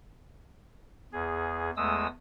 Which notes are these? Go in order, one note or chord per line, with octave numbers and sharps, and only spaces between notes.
E2 G#4
E2 G#3 A3 D#6 E6